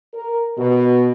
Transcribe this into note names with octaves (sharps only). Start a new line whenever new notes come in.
A#4
B2